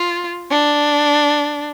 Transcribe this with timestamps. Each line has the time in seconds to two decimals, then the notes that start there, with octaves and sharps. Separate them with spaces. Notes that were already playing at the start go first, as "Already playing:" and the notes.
Already playing: F4
0.50 D4